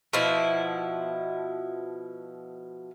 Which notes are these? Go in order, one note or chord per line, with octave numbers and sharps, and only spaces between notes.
B2 F3 E4